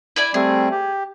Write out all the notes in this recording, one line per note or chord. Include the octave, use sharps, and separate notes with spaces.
E4 D5 G#5
G3 A3 C4 G#4
G4